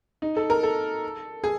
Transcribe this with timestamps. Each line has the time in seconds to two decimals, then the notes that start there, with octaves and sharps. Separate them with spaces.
0.22 D#4
0.36 A4
0.50 A#4
0.63 A4
1.44 G#4